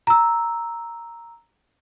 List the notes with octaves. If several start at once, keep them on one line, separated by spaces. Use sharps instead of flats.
A#5 E6